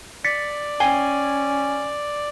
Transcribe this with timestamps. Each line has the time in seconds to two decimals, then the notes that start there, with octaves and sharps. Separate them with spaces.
0.24 D5 A6 B6 C#7
0.80 C#4 G5 G#5 C7 G7